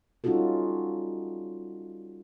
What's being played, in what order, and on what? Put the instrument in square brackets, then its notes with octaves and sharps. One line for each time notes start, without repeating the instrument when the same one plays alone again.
[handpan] G3 C#4 D#4 F4 F#4 A4